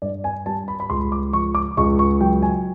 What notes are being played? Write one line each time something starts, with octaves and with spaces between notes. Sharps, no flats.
G2 D5
G#5
G3 A5
B5
B5
C#2 C6
D6
F3 C#6
D6
C#2 C#6
C#6
F#3 G5
G#5